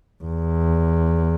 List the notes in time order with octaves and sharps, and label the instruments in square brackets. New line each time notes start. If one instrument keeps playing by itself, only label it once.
[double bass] E2